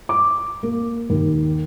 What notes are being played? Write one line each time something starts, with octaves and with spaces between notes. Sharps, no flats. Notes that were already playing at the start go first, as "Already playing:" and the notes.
D6
A#3
D#2